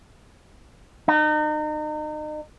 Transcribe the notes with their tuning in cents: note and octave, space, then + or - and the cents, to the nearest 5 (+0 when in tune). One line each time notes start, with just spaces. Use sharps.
D#4 -35